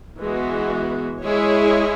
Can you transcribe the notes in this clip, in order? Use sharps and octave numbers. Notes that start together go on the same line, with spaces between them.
E3 G#3 B3 F#4
G#3 E4 G#4 C#5